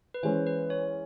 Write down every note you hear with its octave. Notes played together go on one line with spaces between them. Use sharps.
B4
E3 G#3 C#4 C5
B4
C#5